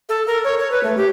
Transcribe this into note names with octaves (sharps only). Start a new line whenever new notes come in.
A4
A#4
C#5
C#5
B4
A3
G4